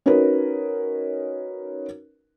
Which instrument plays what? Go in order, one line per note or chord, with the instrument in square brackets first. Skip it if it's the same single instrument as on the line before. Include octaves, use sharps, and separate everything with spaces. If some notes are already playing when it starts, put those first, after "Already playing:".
[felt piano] C#4 D#4 F#4 A#4 B4